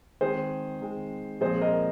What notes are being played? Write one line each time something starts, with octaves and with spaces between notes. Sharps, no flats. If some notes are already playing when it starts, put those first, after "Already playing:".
D#3 G#3 C4 G#4 C5
D#3 G#3 C4
A#2 F3 G#3 C4 G#4 C5
A#4 D#5